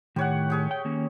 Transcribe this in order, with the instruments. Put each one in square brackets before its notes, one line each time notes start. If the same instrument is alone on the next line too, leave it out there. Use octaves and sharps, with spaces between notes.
[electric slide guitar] A2 D#3 [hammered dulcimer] G4 C#5 F#5
[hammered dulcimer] G4 G#4 C#5
[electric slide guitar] G5
D#3 A#3 C#4